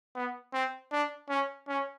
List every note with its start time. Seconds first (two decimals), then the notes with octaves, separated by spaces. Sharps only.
0.15 B3
0.54 C4
0.92 D4
1.29 C#4
1.68 C#4